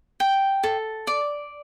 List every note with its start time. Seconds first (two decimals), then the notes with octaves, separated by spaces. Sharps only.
0.20 G5
0.64 A4
1.07 D5